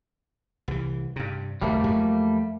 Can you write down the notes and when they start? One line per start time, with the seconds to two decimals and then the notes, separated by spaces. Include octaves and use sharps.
0.68 C2 E3
1.16 G2 C3
1.62 F#1 D#2 G3 A3 A#3
1.84 F2 F3 F#3